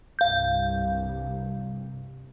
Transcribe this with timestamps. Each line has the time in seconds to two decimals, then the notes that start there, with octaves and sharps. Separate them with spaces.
0.19 C2 G2 F5 G6